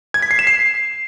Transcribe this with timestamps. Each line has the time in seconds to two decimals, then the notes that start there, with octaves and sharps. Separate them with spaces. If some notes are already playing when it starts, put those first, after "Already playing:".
0.14 G#6
0.22 B6
0.31 C7
0.39 E7
0.47 C7